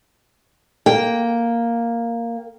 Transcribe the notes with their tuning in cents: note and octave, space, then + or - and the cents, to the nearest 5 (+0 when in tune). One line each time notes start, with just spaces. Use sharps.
A#3 +0 G5 -15